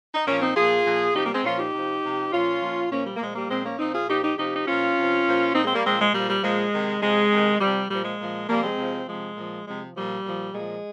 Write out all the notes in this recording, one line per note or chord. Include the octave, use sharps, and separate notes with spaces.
D#4
A#2 F3 A#3 C#4
C4 D#4
A#2 F3 F4 G#4
A#2 F3
C3 F3 D#4 G4
G3 A#3
G#3 C4
A#2 F3 C#4 F4
D#4 G4
C3 F3
C3 F3
A#2 F3 C#4 F4
A#2 F3
A#2 F3 A#3 C#4
G3
A#3
A#2 F3 G#3
G3 A#3
A#2 F3 G#3 C4
A#3 C#4
A#2 F3 C4 D#4
F4 G#4
A#2 F3 D#4 G4
D#4 G4
C3 F3 D#4 G4
D#4
A#2 F3 C#4 F4
C3 F3
A#2 F3
A#2 F3 C4 D#4
G#3 C4
G3 A#3
A#2 F3 G#3 C4
G#3
A#2 F3 G3
G3
A#2 F3 G#3
C3 D#3
C3 F3 G#3
C3 D#3
C3 F3 G3
A#2 F3 G3
G#3
A#2 F3
C3 F3 G3 A#3
G#3 C4
C3 F3
C3 F3 G#3
A#2 F3
C3 F3 G#3
A#2 F3 G3
A#2 F3
A#2 F3 G#3